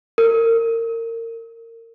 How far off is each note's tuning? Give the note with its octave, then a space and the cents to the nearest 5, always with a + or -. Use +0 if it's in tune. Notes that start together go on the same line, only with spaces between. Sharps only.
A#4 -30